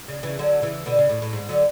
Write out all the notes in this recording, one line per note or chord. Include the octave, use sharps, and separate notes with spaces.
C#3
C#3 E3
D3 F#3
C#3 E3
B2 D3
C#3
A2
A2
G#2
D3 F#3